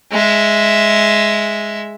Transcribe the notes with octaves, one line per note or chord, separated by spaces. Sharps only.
G#3 E5